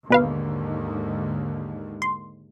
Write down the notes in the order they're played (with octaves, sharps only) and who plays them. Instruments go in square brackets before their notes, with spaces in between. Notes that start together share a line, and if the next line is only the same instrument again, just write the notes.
[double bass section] D#2 G#2 D3 [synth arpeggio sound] B2 B4 F5
[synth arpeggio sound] C6